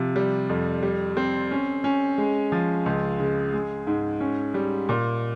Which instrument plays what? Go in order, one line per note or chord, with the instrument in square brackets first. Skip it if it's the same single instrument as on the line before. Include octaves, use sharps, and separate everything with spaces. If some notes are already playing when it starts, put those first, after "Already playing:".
Already playing: [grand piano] C3 F3
G3
F2
G3
C4
C#4
C#4
G#3
F3
C#2
C#3
G#3
G#2
C#4
G3
A#2